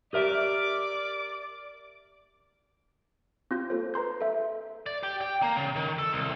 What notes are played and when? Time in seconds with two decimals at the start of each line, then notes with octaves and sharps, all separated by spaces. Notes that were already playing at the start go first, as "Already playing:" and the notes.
0.13 G4 A#4 D5 E5 D6
3.51 C4 F4 G6
3.70 A#3 A4 C5
3.94 B4 A#5 C6 G6
4.21 A4 E5
4.86 D5
5.03 G4
5.21 G5
5.42 A#3
5.57 C#3
5.76 D#3
5.98 A4
6.13 C2